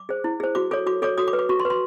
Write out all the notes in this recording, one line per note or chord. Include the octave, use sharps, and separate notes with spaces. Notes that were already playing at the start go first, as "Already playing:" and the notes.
Already playing: D6
G#4 C5
E4
G#4 C5
F#4 D6
A4 C#5 D6
F#4 D6
A4 C#5 D6
F#4 D#6
D6
B4
D6
F#4 C#6
C6
B4
C6